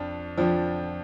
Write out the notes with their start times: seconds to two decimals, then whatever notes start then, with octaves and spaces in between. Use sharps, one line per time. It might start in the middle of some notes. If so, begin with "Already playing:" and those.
Already playing: F2 F3 D4
0.38 F2 F3 D4